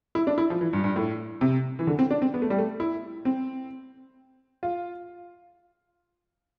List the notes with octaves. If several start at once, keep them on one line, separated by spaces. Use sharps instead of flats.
E4
D4
E4
F3
E3
G2
G2
A2
C3
E3
D3
C4
D4
C4
B3
A3
G3
A3
E4
C4
F4